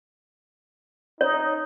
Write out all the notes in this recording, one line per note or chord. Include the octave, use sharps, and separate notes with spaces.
D#4 C#5